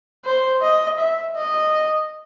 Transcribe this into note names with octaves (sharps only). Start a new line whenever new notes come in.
C5
D#5
E5
D#5